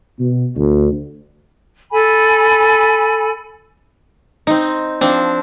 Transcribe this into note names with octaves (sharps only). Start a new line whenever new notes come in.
B2
D2
A4 G#5 B5
C4 D#4
F3 C4 D4